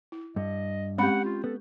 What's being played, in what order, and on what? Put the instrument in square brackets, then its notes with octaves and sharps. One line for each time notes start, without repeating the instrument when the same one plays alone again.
[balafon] E4
[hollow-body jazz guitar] G2 [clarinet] D#5
[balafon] G#3 C4 B5 [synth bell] C#4 G4 [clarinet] F#5
[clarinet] F4
[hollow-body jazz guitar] B3 [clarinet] A4